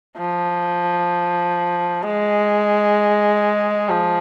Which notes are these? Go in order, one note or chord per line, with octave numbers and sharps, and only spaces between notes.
F3
G#3
F3